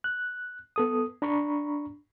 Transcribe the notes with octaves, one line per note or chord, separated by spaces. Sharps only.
F#6
B3 A4 D#6
D4 A#5 B5 C#6